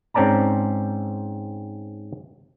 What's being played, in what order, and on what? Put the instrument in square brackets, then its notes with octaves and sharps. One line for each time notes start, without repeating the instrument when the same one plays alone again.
[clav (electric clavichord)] G#2 C4 C#4 D5 A5 A#5